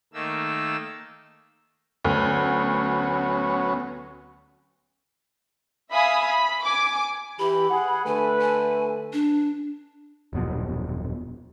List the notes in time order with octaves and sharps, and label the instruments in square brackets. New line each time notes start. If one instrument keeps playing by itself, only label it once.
[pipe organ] D#3 A3 A#3 E6
[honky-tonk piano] D2 [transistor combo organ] F#3 B3 C#4
[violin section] E5 F5 G#5 B5 D#6
B5
G#5 D6
[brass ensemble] E3 G4 [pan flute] B5
[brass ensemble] G#4 F#5
[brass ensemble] D3 A3 B4 [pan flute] G#5
[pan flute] G#5
D4
[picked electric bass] D#1 F#2 B2 F3